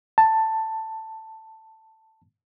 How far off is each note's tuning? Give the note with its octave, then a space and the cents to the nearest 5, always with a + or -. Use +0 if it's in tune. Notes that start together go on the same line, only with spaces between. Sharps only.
A5 +10